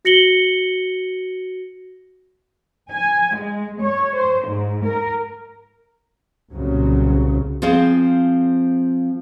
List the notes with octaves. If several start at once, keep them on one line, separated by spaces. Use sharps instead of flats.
F#4 A#6 C#7 F#7 G7
G#5
G#3
C#5
C5
G#2
A#4
C2 A#2 C#3 F#3
F3 C4 G#4 F5